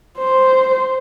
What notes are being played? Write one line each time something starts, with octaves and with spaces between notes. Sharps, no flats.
C5